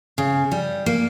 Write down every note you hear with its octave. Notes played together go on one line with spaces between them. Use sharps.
C#3
G3
A#3